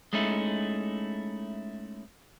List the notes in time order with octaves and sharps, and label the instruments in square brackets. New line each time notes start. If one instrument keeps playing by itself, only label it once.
[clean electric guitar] G#3 A3 C#4 D#4 E4